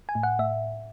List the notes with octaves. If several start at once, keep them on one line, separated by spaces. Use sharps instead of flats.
G#5
A2
F#5
A2 E5